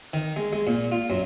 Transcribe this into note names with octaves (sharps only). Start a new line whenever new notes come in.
D#3
G#3
G#3
A#2
F4
F#2